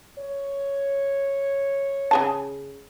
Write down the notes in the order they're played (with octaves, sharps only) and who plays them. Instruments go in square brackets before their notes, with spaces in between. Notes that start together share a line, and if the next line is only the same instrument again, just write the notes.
[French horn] C#5
[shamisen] C#3 G#4 A5